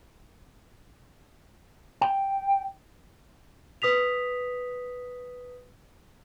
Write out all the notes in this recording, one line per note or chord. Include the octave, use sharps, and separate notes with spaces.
G5
B4 D#6 B6 F7